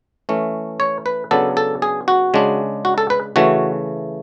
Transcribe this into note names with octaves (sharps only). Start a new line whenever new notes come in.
E3 A3 C#4
C#5
B4
C#3 F#3 B3 D4 A4
A4
G#4
F#4
C#3 G#3 D4
F#4
A4
B4
C#3 E3 A3 F#4